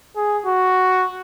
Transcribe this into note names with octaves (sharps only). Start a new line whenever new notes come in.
G#4
F#4